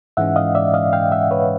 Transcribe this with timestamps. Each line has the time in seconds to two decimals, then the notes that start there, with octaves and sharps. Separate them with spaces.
0.17 G#2 E3 G#3 C#4 E5 F#5
0.36 D#5 F5
0.55 D5 E5
0.74 D#5 F5
0.93 F5 G5
1.12 E5 F#5
1.31 B4 C#5